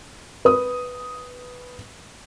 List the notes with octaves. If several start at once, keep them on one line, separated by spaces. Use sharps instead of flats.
B4 D#6